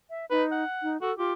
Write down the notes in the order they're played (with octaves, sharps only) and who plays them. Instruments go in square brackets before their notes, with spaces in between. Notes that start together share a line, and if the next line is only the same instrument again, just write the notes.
[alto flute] E5
[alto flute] D#4 [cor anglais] B4
[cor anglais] F#5
[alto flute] D#4
[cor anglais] F#4 [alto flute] A4
[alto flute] F4 [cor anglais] G4